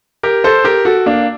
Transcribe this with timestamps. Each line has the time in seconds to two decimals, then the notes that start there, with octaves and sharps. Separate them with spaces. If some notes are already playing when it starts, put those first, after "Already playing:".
0.23 G4 A#4
0.44 A4 C5
0.64 G4 A#4
0.85 F#4 A4
1.06 A#3 D4